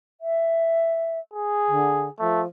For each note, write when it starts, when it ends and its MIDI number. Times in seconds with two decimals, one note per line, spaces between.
0.21 1.19 76
1.34 2.10 68
1.67 2.09 50
2.19 2.46 53
2.19 2.42 57